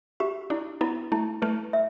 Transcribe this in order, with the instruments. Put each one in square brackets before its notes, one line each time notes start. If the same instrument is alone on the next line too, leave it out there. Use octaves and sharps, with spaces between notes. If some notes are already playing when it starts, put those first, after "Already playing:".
[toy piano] G4 [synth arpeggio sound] E5
[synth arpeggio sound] D4 [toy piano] E4
[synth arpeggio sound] B3 [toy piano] E4
[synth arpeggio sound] A3 [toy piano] E4
[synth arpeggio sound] A3 [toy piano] B4
[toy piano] E5